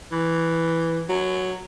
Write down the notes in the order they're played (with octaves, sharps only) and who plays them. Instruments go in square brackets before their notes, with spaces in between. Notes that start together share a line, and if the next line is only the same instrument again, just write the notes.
[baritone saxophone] E3
F#3